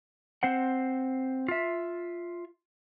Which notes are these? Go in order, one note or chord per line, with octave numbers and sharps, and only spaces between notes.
C4 C5 F#5
F4 E5